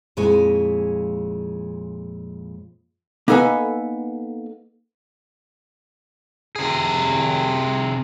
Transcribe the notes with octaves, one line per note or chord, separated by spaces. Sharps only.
F2 A#2 G#3 E4 C#5 G#5
A#3 B3 D#4 A4 B4 G#5
C3 G#4